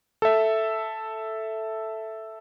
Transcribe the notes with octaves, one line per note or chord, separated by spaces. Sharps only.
A4 E5